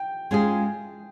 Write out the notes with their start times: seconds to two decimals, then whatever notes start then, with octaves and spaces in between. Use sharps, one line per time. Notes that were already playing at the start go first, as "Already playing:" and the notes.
Already playing: G5
0.31 G#3 C#4 F4 G#4